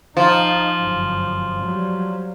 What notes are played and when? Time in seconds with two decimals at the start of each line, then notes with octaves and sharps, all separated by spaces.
0.17 F3 D#4
0.79 G1 F#2
1.62 F#3 G3